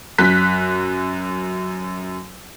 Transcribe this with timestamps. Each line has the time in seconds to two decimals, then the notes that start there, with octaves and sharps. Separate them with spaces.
0.18 F#2 F#6 B6